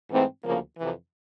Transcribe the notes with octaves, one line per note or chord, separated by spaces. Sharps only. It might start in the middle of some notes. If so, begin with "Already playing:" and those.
G#2 E3 A3 C4
D2 C#3 F3 A#3
F2 C3 E3